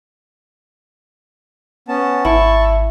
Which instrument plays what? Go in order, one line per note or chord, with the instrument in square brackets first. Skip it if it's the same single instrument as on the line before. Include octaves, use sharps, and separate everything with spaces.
[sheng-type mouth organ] B3 C#4 A5
[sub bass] G#1 [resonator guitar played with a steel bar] E4 [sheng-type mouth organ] A5 C#6